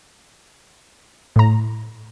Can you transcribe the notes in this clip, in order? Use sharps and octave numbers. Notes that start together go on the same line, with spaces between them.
A2 A#5